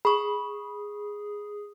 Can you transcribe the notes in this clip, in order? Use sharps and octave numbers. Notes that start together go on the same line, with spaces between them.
G#4 B5 C#6